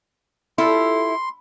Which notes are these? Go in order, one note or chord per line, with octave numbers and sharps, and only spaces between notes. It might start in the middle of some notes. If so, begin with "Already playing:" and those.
E4 F4 G4 A4 C6